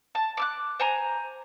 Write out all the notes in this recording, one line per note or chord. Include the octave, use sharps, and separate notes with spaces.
A5
D6 E6 F#6
C5 G#5 A#5